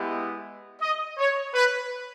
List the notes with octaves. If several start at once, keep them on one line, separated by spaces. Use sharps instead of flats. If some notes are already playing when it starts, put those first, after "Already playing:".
Already playing: G#3 B3 E4 G4
D#5
C#5
B4